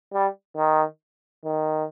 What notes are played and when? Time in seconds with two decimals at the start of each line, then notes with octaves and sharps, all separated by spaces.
0.13 G3
0.57 D#3
1.45 D#3